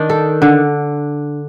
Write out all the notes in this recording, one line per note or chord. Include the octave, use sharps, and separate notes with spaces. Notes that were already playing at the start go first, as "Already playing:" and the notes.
Already playing: D#3 D4
A4
D3